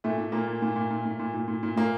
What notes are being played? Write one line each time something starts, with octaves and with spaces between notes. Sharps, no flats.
A#2 A3
A#2
A#2 A#3
A#2
A#2
A#2
A#2
A#2
A#2
A#2
A#2
A#2
A#2 A#3